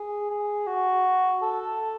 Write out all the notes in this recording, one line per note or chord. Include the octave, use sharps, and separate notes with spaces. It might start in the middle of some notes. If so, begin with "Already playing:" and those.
Already playing: G#4
G#4
F#4
A4